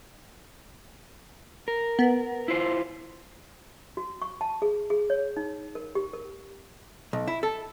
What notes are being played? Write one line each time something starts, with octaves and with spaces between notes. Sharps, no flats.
A#4
B3
E4 F4 C5
F#4
C#6
A5
G#4
G#4
C#5
D#4
A#4
G4
A#4
B1
E4
A4